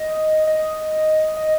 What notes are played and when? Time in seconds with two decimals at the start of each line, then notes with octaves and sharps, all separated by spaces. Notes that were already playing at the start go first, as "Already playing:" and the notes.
Already playing: D#5
0.47 D#5
1.37 D#5